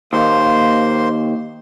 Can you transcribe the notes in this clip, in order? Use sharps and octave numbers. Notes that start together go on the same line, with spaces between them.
D#2 A#3 C5 C6